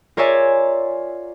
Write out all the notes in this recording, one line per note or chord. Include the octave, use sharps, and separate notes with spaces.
F4 A#4 C#5 D5 E5 G#5